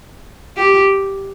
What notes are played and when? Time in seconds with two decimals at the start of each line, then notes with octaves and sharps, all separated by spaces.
0.57 G4